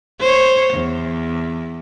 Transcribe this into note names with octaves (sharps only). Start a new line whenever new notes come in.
C5 C#5
E2